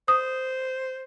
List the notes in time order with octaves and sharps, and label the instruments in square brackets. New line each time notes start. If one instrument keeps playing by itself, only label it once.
[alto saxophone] C5 [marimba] D#6